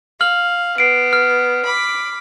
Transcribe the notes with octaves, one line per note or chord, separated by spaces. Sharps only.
F5 F6 F#7
B3 C7 D7
F6
B5 D6